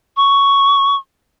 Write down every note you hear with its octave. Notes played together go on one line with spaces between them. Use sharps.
C#6